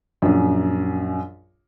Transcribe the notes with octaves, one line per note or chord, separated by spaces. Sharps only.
A#1 F#2